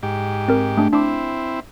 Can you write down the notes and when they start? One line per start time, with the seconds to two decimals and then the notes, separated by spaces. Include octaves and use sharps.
0.03 G#2 G4
0.48 C4 A#4
0.77 A3 D4
0.93 C4 D4 E4 D6